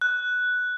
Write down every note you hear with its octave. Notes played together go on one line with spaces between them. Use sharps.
F#6